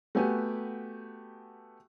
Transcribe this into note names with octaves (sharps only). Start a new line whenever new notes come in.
A3 B3 F#4 G4 B4 G#5